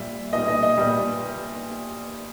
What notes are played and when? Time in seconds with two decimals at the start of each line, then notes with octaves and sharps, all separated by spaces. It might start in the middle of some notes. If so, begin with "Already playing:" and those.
Already playing: A#2 G3 E5
0.33 A#2 G3 D#5
0.48 D#5
0.63 D#5
0.78 A#2 G3